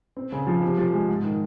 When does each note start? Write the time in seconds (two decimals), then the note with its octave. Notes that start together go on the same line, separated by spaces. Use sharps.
0.17 C4
0.32 C#3
0.47 F3
0.62 C3
0.78 F3
0.93 G#3
1.08 G#2
1.24 D#3